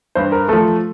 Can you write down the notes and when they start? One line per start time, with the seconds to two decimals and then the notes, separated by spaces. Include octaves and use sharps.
0.15 G2 C5
0.32 A#4
0.48 F3 A3 A4